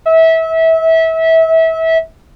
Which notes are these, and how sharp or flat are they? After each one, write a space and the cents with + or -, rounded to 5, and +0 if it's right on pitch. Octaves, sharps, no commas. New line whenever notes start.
E5 -25